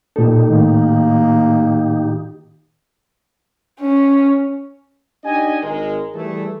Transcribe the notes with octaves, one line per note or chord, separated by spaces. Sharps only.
A#2 D#4 G4 A4
A2 D#3 A#3
C#4
D4 D#4 G4 D#5 G#5
G#1 G#3 A#4
E3 G3 A3 G#4 A4